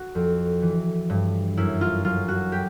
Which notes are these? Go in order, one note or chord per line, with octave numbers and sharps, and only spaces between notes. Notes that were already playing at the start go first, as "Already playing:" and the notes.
Already playing: F#4
F2
E3
G2
F#2 E4
F4
F#3 F4
F#4
G4